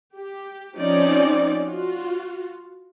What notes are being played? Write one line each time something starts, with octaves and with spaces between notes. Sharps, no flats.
G4
F3 C4 C#4 D#4 D5
F4 F#4